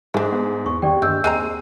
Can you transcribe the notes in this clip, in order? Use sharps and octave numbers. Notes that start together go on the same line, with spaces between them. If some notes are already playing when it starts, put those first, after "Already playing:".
G#2 A3 D4
B3
E2 C#6
D#2 D5 G5
G2 G#3 E6 G6
D#2 G#3 C4 A#5 D#7